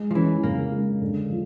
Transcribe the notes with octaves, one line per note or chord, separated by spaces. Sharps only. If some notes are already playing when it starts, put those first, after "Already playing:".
Already playing: G#3
F3
E3 C#4
C#3 A#3
G#3
D3
F3